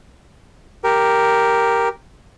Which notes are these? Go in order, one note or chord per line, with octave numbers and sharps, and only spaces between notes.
G4 A#4